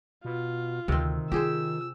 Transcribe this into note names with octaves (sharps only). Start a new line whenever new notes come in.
B2 F4
D2 C3 D#3 C4
F4 G4 G#4 C5 E6